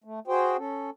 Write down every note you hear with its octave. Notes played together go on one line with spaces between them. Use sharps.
A3
F#4 G#4 C5 G5
C#4 A4